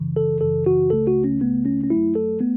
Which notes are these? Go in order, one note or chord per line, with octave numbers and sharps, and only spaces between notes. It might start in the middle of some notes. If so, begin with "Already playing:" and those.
Already playing: F#2 C#3 E3
A4
F#2 C#3 E3 A4
F#4
C#2 C#3 A3 A4
F#4
C#4
C#2 C#3 A3 B3
C#4
C#4
F#2 F#3 A3 E4
A4
A3 B3